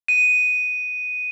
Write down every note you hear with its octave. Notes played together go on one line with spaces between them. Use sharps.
D#7